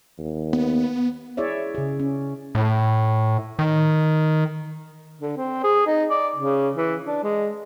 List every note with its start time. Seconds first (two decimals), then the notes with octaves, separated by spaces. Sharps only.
0.18 D#2
0.53 B3
1.37 E4 G#4 C#5 D5 E5
1.75 C#3 G#4
2.00 C#4
2.55 A2
3.59 D#3
5.21 D3
5.37 C4
5.63 G#4
5.87 D#4
6.10 D5
6.36 C#3
6.76 E3
7.06 D4
7.23 G#3